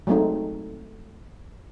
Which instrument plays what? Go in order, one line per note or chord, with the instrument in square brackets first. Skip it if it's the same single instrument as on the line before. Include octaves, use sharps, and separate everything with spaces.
[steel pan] F#3 G#3 A3 C4 D#4